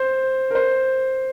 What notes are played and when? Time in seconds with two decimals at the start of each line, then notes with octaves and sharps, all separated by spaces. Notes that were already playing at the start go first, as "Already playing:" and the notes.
Already playing: C5
0.50 A#4
0.55 C5